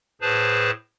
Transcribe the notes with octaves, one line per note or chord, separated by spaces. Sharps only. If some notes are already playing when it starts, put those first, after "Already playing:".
A2 G#4 B4 C5 A5